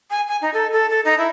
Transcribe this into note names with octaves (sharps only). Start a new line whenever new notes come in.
G#5
G#5
D#4
A4
A4
A4
D#4
E4